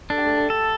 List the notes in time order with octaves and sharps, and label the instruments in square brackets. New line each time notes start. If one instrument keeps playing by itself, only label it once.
[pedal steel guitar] D4 [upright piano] A4
[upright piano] G4
A3 A4
A3 A4
[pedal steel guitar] A4